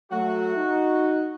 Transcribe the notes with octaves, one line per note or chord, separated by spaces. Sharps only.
F#3 A3 F#4
D#4